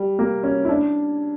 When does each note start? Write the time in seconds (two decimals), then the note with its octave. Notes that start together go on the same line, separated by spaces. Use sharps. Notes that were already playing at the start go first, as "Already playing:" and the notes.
Already playing: G3
0.19 A#3
0.44 C#4
0.65 E4
0.69 D4